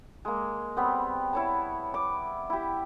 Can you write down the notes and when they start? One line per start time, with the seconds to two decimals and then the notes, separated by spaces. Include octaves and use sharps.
0.25 G#3 A#3
0.76 G3 B3 C4
1.33 E4 C#5 A5
1.94 D6
2.50 E4 G4